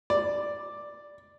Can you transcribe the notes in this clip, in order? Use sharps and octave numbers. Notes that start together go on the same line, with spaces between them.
D5